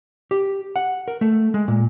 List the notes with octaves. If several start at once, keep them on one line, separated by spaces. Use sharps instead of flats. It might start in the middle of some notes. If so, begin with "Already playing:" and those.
G4
F#5
A#4
A3
G#3
A#2